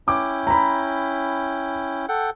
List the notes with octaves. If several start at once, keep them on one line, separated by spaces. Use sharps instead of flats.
C#4 E4 G5 D6
A#5 B5
A4 F#5 G5